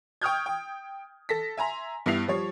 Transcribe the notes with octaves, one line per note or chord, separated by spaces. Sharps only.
G5 C#6 D#6 F6 G6 G#6
G5
A4 A#6 B6
E5 G#5 A#5 C6
G2 B3 E4 C7 F7
F3 G3 C#5